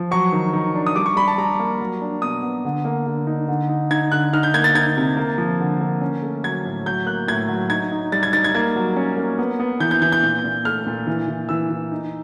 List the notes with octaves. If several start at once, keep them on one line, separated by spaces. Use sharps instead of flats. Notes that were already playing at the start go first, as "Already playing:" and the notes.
Already playing: F3
F#3 C#6
D#3
D#3
D4
D#6
G3 D6
C#6
G3 B5
A5
G3 A#5
A#3
F#3
D4
B2 D#6
B3
D3
A#3
D3
D#4
D3
D#4
D#4 G#6
D3 F#6
D#4 F6
G6
A#3 G#6
A6
D#4 G#6
C3
A#3
F3
D3
A#3
C#4
A3
F#3 G#6
A2
F#3 G6
A#3 F#6
A2 G#6
F#3
D#4 G#6
D#4
G3 A6
G#6
D#4 A6
G#6
A#3 G#6
F#3
C#4
A#3
B3
B3
E3 G6
G6
E3 G6
G6
A#2
A#2
A3 F6
A#2
E3
E3
E3 E6
E3
D#4